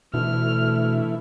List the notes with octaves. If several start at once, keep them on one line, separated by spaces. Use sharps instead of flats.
D2 B2 E3 A3 E4 F6